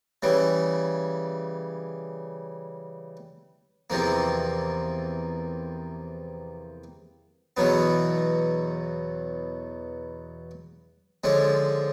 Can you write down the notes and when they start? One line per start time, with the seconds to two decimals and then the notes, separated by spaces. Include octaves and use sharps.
0.23 C#3 E3 G3
3.90 E2 C3 F3 A#3
7.57 E2 B2 F#3 B3
11.24 D3 F3 G#3 C#4